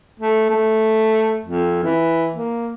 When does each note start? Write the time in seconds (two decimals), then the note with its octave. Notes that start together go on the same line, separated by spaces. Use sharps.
0.20 A3
0.50 A3
1.45 F2
1.84 E3
2.35 A#3